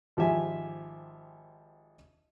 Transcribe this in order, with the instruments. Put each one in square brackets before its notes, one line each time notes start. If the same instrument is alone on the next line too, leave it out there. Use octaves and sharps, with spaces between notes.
[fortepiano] G#1 F3 G4 E5 G#5